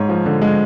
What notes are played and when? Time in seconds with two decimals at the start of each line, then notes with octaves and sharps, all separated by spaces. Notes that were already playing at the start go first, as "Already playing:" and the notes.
Already playing: G#2 C#5
0.09 F3
0.26 D3
0.42 G#3